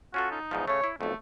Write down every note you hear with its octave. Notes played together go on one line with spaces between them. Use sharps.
C#4 F4 F#4 A4
D#4
E2 G#2 F3
C#3 A3 C#5
E4
B1 F2 A3